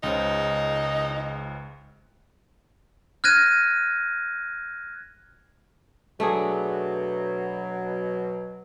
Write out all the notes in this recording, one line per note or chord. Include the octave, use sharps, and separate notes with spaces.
C#2 C#3 D#4 C5
F6 F#6 G#6 A#6 D#7
B2 F#3 A3 D4 G#4